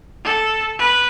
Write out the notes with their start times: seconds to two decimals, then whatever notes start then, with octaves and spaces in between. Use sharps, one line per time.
0.25 A4
0.79 B4